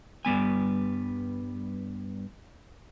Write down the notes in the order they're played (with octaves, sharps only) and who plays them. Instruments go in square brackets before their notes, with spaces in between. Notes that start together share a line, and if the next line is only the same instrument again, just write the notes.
[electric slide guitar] G2 G3 B3 G#5